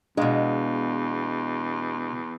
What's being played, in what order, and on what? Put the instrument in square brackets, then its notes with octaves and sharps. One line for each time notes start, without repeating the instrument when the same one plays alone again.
[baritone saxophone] E2 [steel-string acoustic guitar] B2 G#3 [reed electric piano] D4 D#5 F5